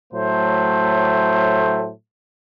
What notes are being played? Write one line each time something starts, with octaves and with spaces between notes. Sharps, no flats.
A2 F#3 A3 C5